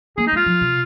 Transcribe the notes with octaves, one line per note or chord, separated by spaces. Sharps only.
A#3 G#4
D#4
G#3 F4
F3
C3